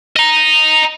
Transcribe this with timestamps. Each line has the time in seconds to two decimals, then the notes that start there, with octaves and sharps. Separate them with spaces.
0.16 D#5 A#5